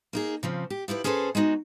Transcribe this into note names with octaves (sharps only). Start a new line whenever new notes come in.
A#3 D#4 G#4
C#3 F3 C4
G4
F3 E4 G4 B4
C#4 G#4 A4 B4 C5
G#3 B3 D#4 F#4